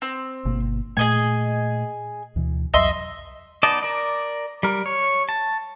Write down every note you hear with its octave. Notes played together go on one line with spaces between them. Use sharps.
C4
G1 B2 A#3
A#2 A3 G#4 D#5 G#5
D2 B2 E3
C2 F2 F#3 D#5 E5 C6
B3 D#4 D5 D#5 A5
A#4 D5
G3 A#4
C#5
A5